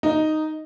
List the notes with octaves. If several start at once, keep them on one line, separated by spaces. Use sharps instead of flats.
D#4